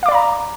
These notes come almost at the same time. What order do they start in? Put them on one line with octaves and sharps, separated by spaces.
F5 D6 D5 B5 A#5